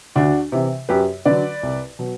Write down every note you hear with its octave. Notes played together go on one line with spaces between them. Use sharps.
D2 D4 F#4
C3 E3
F#2 G4 B4
D3 F#3 B4 D5
C2
B2 F#3